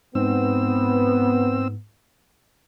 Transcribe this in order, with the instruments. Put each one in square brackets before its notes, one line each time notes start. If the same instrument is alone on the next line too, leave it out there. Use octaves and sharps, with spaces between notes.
[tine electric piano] G#2 [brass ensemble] B3 [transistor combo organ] C4 E6